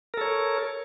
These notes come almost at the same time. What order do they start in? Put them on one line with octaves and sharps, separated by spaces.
A#4 A4 C#5